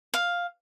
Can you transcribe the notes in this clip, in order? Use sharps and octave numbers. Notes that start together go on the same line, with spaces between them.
F5